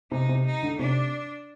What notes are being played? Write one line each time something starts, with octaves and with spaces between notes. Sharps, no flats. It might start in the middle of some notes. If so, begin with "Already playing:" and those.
C3 D#4
C3
D#4
D3
C3 D4